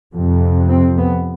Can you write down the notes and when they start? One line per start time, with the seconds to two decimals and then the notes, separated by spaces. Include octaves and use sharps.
0.14 F2 C3
0.69 C4
0.98 B3